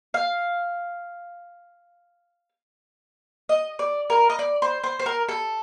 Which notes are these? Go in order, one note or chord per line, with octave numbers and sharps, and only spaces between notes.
F5
D#5
D5
A#4
D#5
D5
C5
C5
C5
A#4
A4